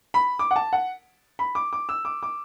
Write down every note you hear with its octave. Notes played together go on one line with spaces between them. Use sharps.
B5
D6
F#5
A5
F#5
B5
D6
D6
E6
D6
D6